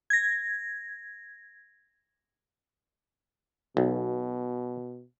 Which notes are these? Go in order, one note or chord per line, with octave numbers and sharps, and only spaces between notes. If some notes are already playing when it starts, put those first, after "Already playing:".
G#6 A#6
B1 B2